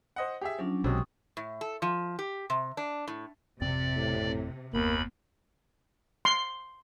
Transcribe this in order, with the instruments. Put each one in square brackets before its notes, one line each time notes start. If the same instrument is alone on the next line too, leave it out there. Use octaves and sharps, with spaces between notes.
[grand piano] C5 D#5 F#5
G4 G#4 E5
[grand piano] F3 [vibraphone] F#3 C#4 D4
[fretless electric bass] B1 [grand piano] C3 F#3 G#3 [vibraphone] G5 C#6 D#6
[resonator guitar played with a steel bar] A2
A4
F3
G4
C3
D4
A2
[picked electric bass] G#1 F2 C4 [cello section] C3 [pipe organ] D5
[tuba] A2
[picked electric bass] F#1 C3 B3 [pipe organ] D#2 B5 [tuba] A#3
[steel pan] C6